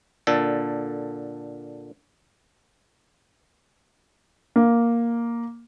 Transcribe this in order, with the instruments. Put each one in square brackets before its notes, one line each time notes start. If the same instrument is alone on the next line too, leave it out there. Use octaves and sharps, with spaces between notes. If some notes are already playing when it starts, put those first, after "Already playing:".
[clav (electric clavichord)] A#2 D3 A4
[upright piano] A#3